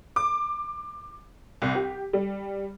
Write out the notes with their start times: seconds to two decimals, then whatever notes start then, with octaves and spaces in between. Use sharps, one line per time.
0.16 D6
1.62 C2
1.75 G4
2.13 G3